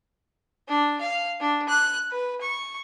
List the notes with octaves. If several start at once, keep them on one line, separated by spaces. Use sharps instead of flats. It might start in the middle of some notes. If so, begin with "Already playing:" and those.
D4
F5
D4
F#6
B4
C#6